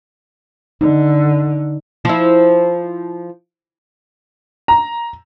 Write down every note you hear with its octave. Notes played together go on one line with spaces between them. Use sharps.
D3 D#4
F3 E4
A#5